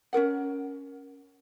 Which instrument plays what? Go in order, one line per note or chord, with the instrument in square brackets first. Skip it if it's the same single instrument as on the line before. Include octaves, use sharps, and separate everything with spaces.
[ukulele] C#4 F4 A#4 F#5